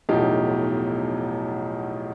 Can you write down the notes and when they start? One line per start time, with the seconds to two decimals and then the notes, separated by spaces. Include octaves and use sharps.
0.09 B1 E2 A2 F3 D#4 G4